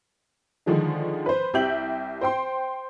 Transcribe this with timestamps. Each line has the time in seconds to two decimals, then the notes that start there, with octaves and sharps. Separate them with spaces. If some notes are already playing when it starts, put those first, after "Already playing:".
0.66 D3 D#3 F3 G#3 D4
1.26 B4 C5
1.54 C2 G3 E5 G5 G6 F#7
2.21 C5 G5 C6